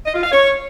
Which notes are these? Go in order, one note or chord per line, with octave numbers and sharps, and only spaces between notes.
D#5
F4
F5
C#5